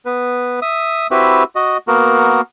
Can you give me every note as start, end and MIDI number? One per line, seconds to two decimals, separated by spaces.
0.05 0.60 59
0.05 0.60 71
0.62 1.07 76
0.62 1.07 87
1.11 1.44 60
1.11 1.44 64
1.11 1.44 66
1.11 1.44 67
1.11 1.44 71
1.11 1.44 76
1.55 1.77 66
1.55 1.77 75
1.88 2.41 58
1.88 2.41 59
1.88 2.41 66
1.88 2.41 70